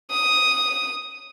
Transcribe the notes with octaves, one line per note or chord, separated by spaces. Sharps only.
D#6